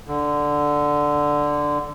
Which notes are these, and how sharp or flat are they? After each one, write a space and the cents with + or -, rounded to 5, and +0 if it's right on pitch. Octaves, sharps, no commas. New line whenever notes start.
D3 +0